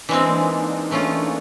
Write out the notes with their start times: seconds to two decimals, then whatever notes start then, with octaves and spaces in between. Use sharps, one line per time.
0.09 E3 G#3 C4 D4
0.19 D4
0.29 A#3
0.40 D#4
0.50 D4
0.91 E3 A3 C#4 F4